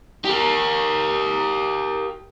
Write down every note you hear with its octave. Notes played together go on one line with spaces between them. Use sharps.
G4 A#4